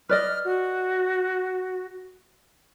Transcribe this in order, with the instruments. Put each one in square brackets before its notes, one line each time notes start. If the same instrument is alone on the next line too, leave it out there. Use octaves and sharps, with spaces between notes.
[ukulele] B4 D5 D#5 [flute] F6
[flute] F#4